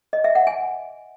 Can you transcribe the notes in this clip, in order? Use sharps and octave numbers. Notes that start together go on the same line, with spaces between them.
D#5
E5
F#5
G#5